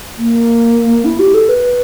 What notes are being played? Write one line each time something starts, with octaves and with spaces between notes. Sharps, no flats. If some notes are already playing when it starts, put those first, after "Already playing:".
A#3
E4
G4
A4
B4